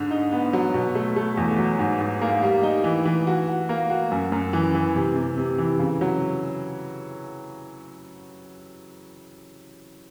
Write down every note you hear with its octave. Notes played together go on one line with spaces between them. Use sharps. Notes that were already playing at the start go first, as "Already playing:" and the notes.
Already playing: G#2 D3
D#4
B3
F#3
B2
A3
A3
E2
F#3
G#2
G#2
A#3
G3
D#4
E3
E3
F#4
F#4
A#3
F#4
F#2
F#2
E3
E3
C3
C3
C3
E3
C#3
F#3